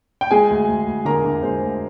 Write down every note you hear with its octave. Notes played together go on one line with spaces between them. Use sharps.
G5
G#3 G#4 G#5
D2
D2
D2
D3 A#4 A#5
D3
G#3 C5
D2